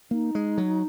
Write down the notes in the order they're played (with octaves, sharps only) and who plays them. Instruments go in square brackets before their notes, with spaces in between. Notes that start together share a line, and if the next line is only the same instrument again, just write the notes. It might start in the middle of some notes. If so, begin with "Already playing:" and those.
[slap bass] A#3 [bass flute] D#4
[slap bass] G#3
F#3